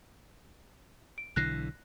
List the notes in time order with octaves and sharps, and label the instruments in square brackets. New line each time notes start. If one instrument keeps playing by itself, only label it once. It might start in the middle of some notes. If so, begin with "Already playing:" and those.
[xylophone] D7
[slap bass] B1 D3 E3 [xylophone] F#6 A#6 C7